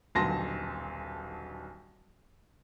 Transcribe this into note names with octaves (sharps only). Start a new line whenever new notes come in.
D#1 B1 D3 A5 C6 A#6